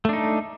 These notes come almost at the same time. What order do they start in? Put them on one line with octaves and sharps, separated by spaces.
A3 D4 D#4